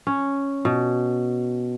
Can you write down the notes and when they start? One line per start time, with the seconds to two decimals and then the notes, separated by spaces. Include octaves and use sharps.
0.07 C#4
0.65 B2